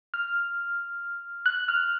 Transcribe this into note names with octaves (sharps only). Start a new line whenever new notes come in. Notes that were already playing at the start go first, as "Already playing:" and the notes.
F6
F#6
F6